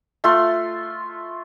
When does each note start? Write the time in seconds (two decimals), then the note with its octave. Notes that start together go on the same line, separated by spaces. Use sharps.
0.24 A3 F4 C6